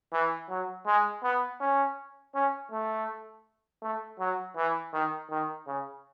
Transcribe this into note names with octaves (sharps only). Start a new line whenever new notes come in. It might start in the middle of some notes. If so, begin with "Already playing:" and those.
E3
F#3
G#3
B3
C#4
C#4
A3
A3
F#3
E3
D#3
D#3
C#3